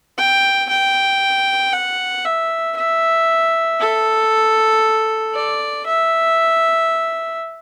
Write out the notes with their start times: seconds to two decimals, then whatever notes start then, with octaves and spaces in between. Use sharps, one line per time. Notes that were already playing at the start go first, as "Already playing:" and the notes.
0.18 G5
0.69 G5
1.73 F#5
2.25 E5
2.76 E5
3.79 A4
5.34 D5
5.86 E5